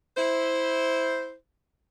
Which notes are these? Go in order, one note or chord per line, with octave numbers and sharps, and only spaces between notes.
E4 C5